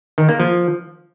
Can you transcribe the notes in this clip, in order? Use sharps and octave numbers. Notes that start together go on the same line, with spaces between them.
D#3
A#3
F3